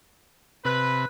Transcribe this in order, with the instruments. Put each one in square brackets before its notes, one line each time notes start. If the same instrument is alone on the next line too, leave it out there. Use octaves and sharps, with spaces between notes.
[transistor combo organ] C3 [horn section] B4